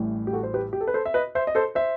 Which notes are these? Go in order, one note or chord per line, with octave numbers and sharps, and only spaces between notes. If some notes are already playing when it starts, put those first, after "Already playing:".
Already playing: A1 A2 E3 G3
G4
F#4 A4
C5
G4 B4
G4
A4
B4
A4 C5
E5
B4 D#5
C5 E5
D#5
A4 C5
C5 E5